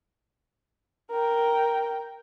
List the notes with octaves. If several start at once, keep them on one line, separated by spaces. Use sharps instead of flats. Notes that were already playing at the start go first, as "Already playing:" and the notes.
A#4 G5